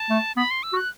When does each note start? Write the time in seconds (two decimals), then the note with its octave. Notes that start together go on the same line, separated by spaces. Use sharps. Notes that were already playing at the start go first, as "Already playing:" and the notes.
Already playing: A5
0.10 A3
0.37 B3 B5
0.51 C6
0.63 E6
0.73 F#4
0.76 F#6